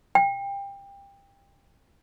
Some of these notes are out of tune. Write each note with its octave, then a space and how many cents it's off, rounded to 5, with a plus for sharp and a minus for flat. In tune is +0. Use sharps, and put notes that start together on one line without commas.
G5 +20